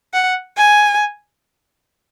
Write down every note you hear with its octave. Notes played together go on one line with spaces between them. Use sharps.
F#5
G#5